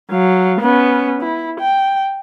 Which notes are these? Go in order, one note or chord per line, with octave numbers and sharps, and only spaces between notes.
F#3 F5
B3 C#4
E4
G5